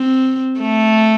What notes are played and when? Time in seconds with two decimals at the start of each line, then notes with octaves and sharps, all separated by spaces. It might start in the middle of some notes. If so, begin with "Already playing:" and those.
Already playing: C4
0.60 A3